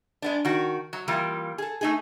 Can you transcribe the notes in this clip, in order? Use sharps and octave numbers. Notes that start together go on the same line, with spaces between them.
G#3 B3 D4
D#3 F#4
F#3
E3 G3 A#3 F4
G#4 A4
A3 D#4 G#4